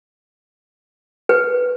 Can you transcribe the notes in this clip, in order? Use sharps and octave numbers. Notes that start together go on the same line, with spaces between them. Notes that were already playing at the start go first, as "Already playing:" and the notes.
B4